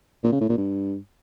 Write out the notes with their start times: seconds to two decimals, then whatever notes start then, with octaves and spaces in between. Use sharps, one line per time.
0.24 A#2
0.32 C#3
0.41 A2
0.49 A#2
0.58 G2